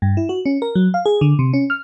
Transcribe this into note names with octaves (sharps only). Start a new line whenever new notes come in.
G2
E4
F#4
C#4
A#4
F#3
F5
G#4
D3
C3
C#4
F6